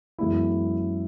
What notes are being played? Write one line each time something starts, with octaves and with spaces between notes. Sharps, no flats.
F#2 E3 G#3 B3 E4